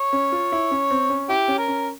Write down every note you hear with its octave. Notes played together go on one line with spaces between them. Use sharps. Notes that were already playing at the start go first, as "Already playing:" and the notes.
Already playing: C#5
C#4
F4
E4
C#4
C4
C#4
E4 G4
C#4
A#4
C#4